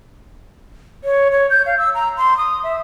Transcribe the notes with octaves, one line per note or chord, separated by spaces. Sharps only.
C#5
C#5
G6
F5
E6
A#5
C6
D#6
E5